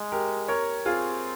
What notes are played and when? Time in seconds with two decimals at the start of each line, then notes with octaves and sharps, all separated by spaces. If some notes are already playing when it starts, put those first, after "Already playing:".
Already playing: G#3
0.12 G4 A#4
0.48 A#4 C#5
0.85 C4 F4 G#4